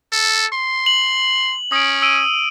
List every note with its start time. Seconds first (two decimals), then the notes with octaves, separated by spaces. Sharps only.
0.12 A4
0.53 C6
0.86 F#7
1.72 C#4 D#6 D7
2.02 E6 D7 D#7